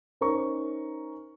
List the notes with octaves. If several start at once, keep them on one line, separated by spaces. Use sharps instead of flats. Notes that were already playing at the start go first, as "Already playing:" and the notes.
C#4 D#4 A#4 C5 A#5 C#6